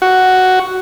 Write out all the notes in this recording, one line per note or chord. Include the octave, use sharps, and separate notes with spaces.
F#4